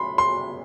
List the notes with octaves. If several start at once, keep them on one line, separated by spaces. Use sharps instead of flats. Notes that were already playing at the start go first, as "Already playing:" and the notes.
Already playing: F#2 B5 C6
C6